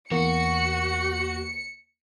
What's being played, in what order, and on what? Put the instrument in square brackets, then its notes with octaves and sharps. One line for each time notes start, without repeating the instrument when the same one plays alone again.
[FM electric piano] E2 A#3 [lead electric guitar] F#4 [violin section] C#7